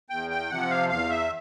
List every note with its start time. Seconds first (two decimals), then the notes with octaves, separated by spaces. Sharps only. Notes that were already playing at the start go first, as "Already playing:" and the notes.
0.10 E2 G5
0.30 G5
0.50 C3 F3 F#5
0.70 F5
0.89 E2 F5
1.10 E5